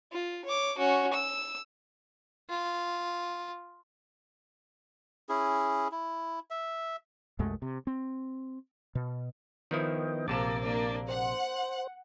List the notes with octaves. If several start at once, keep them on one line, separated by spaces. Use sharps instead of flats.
F4
C#5 D6
C#4 F#4
E6
F4
C#4 E4 G#4
E4
E5
C2 F#2 G#3 A3
C3
C4
B2
D#3 F3 B3 E4 D#5 G5
A#1 C3 A#3 A5 D6 A6
A#3 D4
C5 F#5